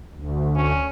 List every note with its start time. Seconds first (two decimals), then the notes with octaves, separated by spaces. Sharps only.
0.11 D2
0.56 C#4